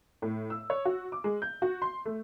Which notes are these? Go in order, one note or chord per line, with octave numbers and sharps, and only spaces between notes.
A2
E6
C#5
F#4
D6
G#3
G6
F#4
C6
A3